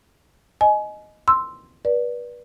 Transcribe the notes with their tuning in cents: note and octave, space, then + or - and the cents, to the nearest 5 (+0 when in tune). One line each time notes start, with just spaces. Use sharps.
D#5 -5 G#5 +25
C6 +0 E6 +0
B4 -30 D5 +0